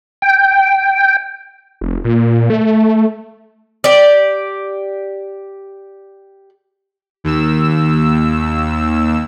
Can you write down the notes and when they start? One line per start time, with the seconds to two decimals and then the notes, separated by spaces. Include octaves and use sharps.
0.22 G5
1.81 F1
2.04 A#2
2.50 A3
3.84 G4 D5
7.24 D#2 E6